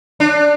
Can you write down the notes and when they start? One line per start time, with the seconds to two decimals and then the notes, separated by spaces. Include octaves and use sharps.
0.20 D4